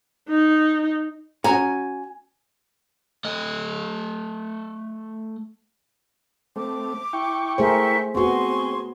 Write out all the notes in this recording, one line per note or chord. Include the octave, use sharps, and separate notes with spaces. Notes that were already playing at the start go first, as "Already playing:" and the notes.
D#4
C#4 F#4 G#5 A#5
A3 D#5
A3 C4 D6
E4 G5 C#6
A3 G#4 A#4 C5 E5
B3 C4 F#4 G#4 C6 C#6